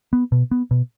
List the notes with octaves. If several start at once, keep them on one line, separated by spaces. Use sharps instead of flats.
B3
B2
B3
B2